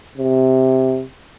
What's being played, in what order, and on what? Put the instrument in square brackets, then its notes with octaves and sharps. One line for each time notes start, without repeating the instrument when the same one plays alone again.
[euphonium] C3